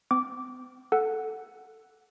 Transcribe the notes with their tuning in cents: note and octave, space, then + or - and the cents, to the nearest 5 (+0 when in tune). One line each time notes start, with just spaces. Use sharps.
C4 -45 D6 -10
A4 +0 F#5 +0